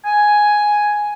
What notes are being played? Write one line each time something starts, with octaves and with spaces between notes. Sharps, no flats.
G#5